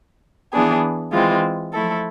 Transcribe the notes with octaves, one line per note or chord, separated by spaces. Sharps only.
E3 B3 D4 G#4
E3 G#3 C4 F4
F3 A3 E4 A4